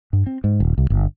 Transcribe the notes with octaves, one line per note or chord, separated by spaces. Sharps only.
G2
C4
G#2
D#1
C2
G1